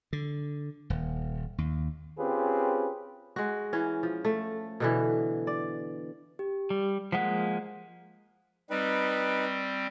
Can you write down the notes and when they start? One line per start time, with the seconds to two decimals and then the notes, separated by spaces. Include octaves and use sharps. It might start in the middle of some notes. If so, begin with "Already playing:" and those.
0.13 D3
0.90 D#1
1.58 D#2
2.18 C4 C#4 F4 G4 G#4 B4
3.36 G#3 F#4
3.73 E3 C#4
4.03 F3
4.25 A3
4.80 B2 D3 E3
5.47 D5
6.39 G4
6.70 G3
7.12 F3 G#3 A#3 F#5 B6
8.70 G3 C4 D#4 B4